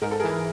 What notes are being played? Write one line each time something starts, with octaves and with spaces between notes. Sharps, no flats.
G#2 A#4
A4
E3 G#4 A#4